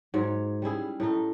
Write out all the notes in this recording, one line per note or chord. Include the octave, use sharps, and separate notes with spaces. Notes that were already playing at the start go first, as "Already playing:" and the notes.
G#2 F#3 C#5
G3 C#4 E4 G#4
A2 A3 D#4